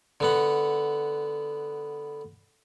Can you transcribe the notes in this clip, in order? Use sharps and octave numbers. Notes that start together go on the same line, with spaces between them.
D3 B3 F#5